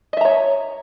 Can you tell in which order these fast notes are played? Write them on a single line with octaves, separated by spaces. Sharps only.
D#5 E5 A#5 C#5